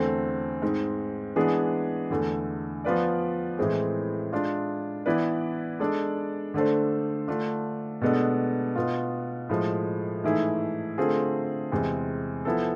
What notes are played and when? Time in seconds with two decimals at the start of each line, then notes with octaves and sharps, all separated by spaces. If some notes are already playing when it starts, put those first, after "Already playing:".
Already playing: E2 D3 A3 C4
0.62 G#2 G#3 C4
1.36 E3 G#3 B3 D4 G#4
2.11 E2 D3 A3
2.84 F3 B3 F4 B4 D5
3.58 A2 E3 G#3 C4 G#4
4.32 G#3 D4 F4
5.06 E3 B3 E4 B4 D5
5.80 G#3 D4 A4 D5
6.54 D3 A3 D4 A4 C5
7.28 D3 A3 D4 F4
8.01 B2 G#3 B3 D4 A4
8.76 B2 B3 F4
9.49 A2 F3 G#3
10.24 G#2 E3 A3 E4 G#4
10.98 D3 A3 C4 F4 G#4
11.72 E2 C3 G#3 C4
12.45 F3 B3 E4 A4